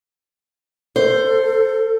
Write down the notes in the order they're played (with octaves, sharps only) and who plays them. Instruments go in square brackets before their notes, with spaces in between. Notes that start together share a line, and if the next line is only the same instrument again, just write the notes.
[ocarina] A4 [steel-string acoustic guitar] C5